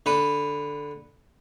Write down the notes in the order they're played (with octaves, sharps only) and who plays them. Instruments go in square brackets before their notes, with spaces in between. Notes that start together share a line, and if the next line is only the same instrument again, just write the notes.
[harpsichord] D3 B4